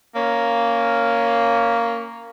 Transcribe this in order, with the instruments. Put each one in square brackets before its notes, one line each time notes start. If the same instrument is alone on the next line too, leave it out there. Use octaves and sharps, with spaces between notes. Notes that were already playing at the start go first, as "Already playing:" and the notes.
[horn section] A#3 C#4